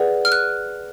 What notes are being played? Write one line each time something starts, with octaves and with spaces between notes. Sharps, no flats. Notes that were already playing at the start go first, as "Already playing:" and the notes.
Already playing: G#4 B4 D5 F#5
F6
F#6